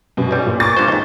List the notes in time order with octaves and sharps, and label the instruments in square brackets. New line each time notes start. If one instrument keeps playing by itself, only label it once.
[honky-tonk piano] F#2 B2
[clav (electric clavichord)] B1 G3
[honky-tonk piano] A#2
[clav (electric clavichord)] A#2 [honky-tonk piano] C#6 D6 A6
[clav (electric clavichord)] G2 A#2 C5
D#2 G#2